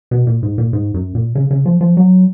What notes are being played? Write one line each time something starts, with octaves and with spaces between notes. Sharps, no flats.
B2
A#2
G#2
A#2
G#2
F#2
A#2
C#3
C#3
F3
F3
F#3